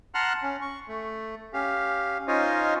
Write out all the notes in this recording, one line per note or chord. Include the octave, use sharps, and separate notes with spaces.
F#5 A5 A#5 C6 F6 F#6
C#4
C#6
A3
C#4 G4 F5
C#4 D#4 F4 C5 C#5 D#5